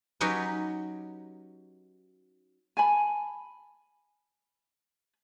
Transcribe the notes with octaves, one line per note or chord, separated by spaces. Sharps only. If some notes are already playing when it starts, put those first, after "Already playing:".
F#3 C#4 D#4 G4 B4
G#5 A5 B5